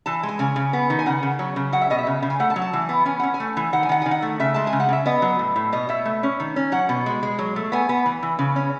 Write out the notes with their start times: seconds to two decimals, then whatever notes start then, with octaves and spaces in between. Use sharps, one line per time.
0.06 E3 A5
0.23 G#3
0.29 G#5
0.39 C#3 G#5
0.56 C#3
0.73 B3
0.90 D#3
0.99 G#5
1.06 C#3 F#5
1.23 C#3
1.39 F#3
1.56 C#3
1.73 F#3 F#5
1.81 E5
1.90 B2 D#5
1.99 E5
2.07 C#3
2.22 C#3
2.30 G#5
2.40 A3 F#5
2.50 A5
2.56 F#3
2.62 A5
2.73 E3
2.89 B3
3.05 C#4 G#5
3.19 C#4 F#5
3.34 G#5
3.40 A3
3.57 E3
3.73 D#3 F#5
3.83 G#5
3.89 D#3 F#5
4.02 D#3 G#5
4.11 F#5
4.22 A3
4.40 C#3 E5
4.54 G#3 A5
4.67 G#5
4.73 C#3
4.80 F#5
4.89 C#3 E5
5.06 B3 D#5
5.22 F#3
5.39 A2
5.56 A2
5.72 B2 D#5
5.89 B2 E5
6.05 A3
6.23 C#4
6.40 D#3
6.56 C#4
6.72 F#3 F#5
6.89 B2
7.06 G#3
7.23 G#3
7.39 F#3
7.56 A3
7.72 B3 G#5
7.89 B3
8.06 E3
8.23 E3
8.39 C#3
8.56 C#4